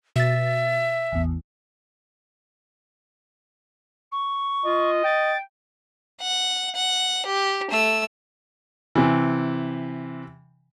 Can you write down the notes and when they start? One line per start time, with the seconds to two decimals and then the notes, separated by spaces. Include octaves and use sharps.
0.16 B2 E5 A6
1.12 A1 E2
4.11 C#6
4.65 F4 D#5
5.04 G5 A6
6.21 F#5
6.75 F#5
7.26 G4
7.71 A3 E6
8.95 C3 E3